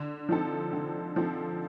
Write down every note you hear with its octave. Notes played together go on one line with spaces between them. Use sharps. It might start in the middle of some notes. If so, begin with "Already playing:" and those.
Already playing: D3
F3 C4 D#4 A4
D3
F3 C4 D#4 A4